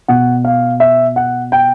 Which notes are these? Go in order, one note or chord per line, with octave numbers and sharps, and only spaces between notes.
B2 F#5
F5
E5
F#5
G5